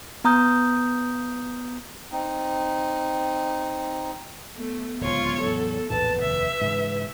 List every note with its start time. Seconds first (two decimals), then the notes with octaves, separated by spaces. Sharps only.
0.24 B3 A#5 D#6 G6
2.12 C4 D#4
4.56 A3 B3
5.01 D1 C#2 F4 C#5
5.41 E2 A2 F#3 A4
5.90 A#1 E2 A2 B4 A5
6.22 F1 D#2 E5
6.61 G#2 C#3 E3